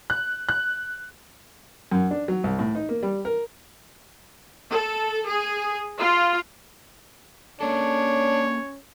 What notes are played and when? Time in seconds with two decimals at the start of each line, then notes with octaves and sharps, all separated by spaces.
0.10 F#6
0.49 F#6
1.91 F#2
2.11 D4
2.28 F#3
2.44 C2
2.59 A2
2.75 D#4
2.89 A#3
3.03 G3
3.25 A#4
4.71 A4
5.28 G#4
5.98 F4
7.61 A#3 C#4 D4 A4 C#5